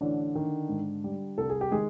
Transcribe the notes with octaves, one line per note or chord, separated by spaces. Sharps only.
A1 D3 D4
D#3
G#2
G3
C2 A4
G#4
G4
D#3 G#3 G#4